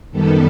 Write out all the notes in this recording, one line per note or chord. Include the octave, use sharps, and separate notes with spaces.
F#2 D#3 G3 B3 A4